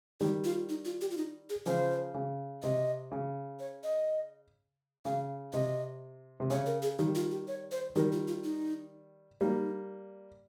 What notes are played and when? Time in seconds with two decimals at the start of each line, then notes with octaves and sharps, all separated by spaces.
0.21 D#3 G3 G4
0.45 F4
0.69 D#4
0.85 F4
1.01 G4
1.11 F4
1.17 D#4
1.50 G#4
1.66 C#3 F3 C5
2.14 C#3
2.62 C3 D#5
3.11 C#3
3.59 C#5
3.84 D#5
5.05 C#3 F5
5.53 C3 D#5
6.40 C3
6.50 C#3 C#5
6.66 A#4
6.82 G#4
6.99 D#3 G3 G4
7.15 F4
7.31 G4
7.48 C#5
7.72 C5
7.96 D#3 G3 A#4
8.12 F4
8.28 F4
8.44 D#4
9.41 G3 A#3 D#4